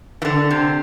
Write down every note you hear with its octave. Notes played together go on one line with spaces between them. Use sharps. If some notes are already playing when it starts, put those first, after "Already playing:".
E3
D3
C3